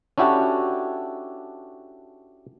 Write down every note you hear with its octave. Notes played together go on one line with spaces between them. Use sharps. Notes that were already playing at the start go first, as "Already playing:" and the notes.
C#4 D4 E4 F#4 G4 A4